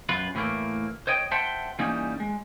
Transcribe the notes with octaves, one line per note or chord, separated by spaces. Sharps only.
F#2 F4 B4
A2 E3 A3 A#3
C5 C#5 D#5 G5
C5 E5 F#5 G5 A5 C6
E3 G3 A#3 C#4 D#4
G#3